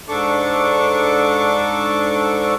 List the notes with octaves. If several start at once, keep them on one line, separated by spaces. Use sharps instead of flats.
G#2 D4 A4 C#6 D6